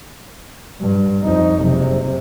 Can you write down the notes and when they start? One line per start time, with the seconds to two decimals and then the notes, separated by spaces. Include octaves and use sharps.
0.81 G2
1.24 F2 D#4
1.62 F#1 C3